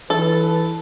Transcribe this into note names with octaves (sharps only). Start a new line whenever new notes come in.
E3 A4 B4